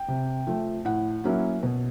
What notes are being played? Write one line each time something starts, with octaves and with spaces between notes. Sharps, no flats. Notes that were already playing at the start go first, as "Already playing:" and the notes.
Already playing: G5
C3
F3 A3
A2 F#5
F#3 A#3 C#4 E4
B2